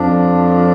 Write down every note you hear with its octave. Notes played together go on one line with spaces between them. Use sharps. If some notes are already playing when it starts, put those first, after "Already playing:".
Already playing: F2 F3 D4